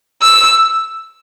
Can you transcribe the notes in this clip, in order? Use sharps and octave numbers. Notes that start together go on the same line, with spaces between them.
E6